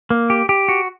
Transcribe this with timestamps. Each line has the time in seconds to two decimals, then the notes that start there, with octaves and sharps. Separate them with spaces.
0.10 A#3
0.30 G4
0.49 G4
0.69 F#4